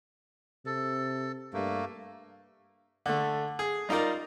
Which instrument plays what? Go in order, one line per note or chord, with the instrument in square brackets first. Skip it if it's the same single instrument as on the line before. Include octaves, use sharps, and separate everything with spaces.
[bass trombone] C3 [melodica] A4
[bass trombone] G2 [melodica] A3 A#3
[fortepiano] D3 A3
G#4
G3 D#4 F4 A#4 D5